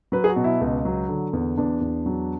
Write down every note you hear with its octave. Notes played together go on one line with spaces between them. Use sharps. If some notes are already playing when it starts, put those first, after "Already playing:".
F#3 B4
G#4
F#4
B2
E4
C#2
F#3
D3
E2
E2 D4
E2
F#3